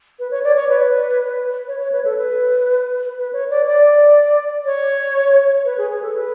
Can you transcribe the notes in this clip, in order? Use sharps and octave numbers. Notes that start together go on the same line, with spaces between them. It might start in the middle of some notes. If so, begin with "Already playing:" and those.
B4
C#5
D5
C#5
B4
C#5
C#5
B4
A4
B4
B4
C#5
D5
D5
C#5
B4
G#4
G#4
A4
B4